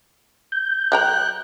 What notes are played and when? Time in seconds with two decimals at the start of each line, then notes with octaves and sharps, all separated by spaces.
0.52 G6
0.92 F#3 G5 A#5 F#6